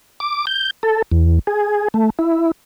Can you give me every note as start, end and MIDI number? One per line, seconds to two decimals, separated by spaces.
0.20 0.45 86
0.47 0.70 91
0.83 1.02 69
1.12 1.39 40
1.47 1.88 68
1.94 2.10 57
2.19 2.51 64